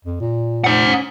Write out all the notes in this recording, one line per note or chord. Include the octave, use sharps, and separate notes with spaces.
F2
A#2
C5 F#5
C#4